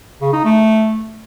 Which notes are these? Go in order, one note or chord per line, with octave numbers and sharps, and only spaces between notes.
C#3
D#4
A3